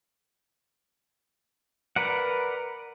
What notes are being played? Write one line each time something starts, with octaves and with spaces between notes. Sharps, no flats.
A#4 B4 D5 F#5